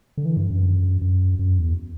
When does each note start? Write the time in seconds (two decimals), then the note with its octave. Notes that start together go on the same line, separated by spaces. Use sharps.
0.17 D3
0.25 E3
0.37 G2
0.50 F#2
1.02 F#2
1.39 F#2
1.58 E2